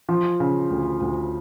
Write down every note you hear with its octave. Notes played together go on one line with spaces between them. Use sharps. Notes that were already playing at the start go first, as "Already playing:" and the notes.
F3
C#3
D2
D2